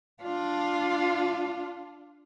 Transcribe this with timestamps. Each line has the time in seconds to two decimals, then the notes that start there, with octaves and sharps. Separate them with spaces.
0.23 D4 F4